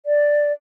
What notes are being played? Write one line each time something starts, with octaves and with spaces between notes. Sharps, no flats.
D5